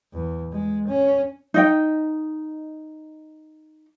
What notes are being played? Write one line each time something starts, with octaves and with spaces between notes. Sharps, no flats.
E2
G#3
C#4
D#4 D#5 G5